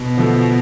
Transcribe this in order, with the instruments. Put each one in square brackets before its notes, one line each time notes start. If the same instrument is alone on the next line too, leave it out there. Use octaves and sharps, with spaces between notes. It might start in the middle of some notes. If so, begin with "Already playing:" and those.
Already playing: [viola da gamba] B2
[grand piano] D3 F3 A3